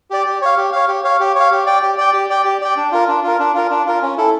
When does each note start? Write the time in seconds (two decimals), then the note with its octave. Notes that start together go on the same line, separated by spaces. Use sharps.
0.10 G4 D5
0.26 G4
0.42 C#5 F5
0.57 G4
0.72 C#5 F5
0.88 G4
1.04 C#5 F5
1.20 G4
1.35 C#5 F5
1.51 G4
1.66 D5 G5
1.82 G4
1.98 D5 G5
2.13 G4
2.30 D5 G5
2.45 G4
2.62 D5 G5
2.77 D4
2.92 F4 A#4
3.08 D4
3.23 F4 A#4
3.39 D4
3.55 F4 A#4
3.70 D4
3.86 F4 A#4
4.02 C#4
4.17 E4 A4